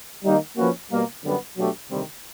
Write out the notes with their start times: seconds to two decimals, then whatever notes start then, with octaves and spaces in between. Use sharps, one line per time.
0.24 D#3 G3 A#3 D#4
0.57 F3 A#3 C#4 F#4 B4
0.91 B2 G3 A#3
1.24 F#2 D3 G3 B3
1.56 B2 F#3 A3 D4 G4
1.90 D2 C3 D#3 G3 C4